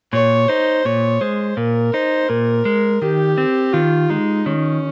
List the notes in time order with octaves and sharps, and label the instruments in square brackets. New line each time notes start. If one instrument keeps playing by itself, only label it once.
[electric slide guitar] A#2 [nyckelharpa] C#5
[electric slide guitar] D#4 [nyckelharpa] C5
[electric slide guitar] A#2 [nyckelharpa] C#5
[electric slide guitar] G#3 [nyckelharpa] C5
[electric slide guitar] A#2 [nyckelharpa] A#4
[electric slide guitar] D#4 [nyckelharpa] C5
[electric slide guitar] A#2 [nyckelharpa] A#4
[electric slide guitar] G#3
[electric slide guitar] D#3 [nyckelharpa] G4
[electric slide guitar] C4
[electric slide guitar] D#3 [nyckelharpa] F4
[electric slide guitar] G#3 [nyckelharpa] D#4
[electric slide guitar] D#3 [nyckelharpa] C#4